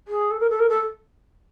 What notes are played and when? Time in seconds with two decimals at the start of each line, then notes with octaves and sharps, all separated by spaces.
0.08 G#4
0.31 A4
0.40 A#4
0.50 A4
0.59 A#4
0.69 A4